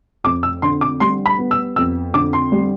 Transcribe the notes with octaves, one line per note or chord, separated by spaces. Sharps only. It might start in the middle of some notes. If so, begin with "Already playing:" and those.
F2 D6
E6
D3 C6
D6
G3 C6
B5
B3
E6
F2 E6
D3 D6
C6
G3